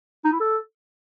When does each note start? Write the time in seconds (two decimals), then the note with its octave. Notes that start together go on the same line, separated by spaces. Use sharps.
0.25 D#4
0.32 E4
0.40 A4